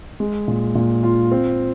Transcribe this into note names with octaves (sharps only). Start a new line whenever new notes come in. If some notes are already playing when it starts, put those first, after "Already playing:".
G#3
A#2
A#2
F4
C4